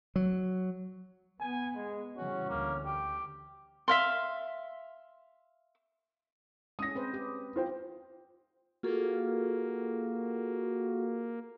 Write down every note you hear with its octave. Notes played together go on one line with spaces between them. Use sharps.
F#3
B3 G#5
G#3
C#3 E3 G3 C#4 F#4
D2 A#3
G4 G5
E5 F5 C6
G#3 C#4 D#6 A#6
C4 B4 C5
G4
F4 C5 G5
A#3 F4 F#4 G#4 A4